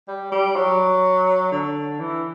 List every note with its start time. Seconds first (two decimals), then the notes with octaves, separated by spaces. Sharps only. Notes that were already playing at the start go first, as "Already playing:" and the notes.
0.08 G3
0.32 G3
0.56 F#3
1.52 D3
2.00 E3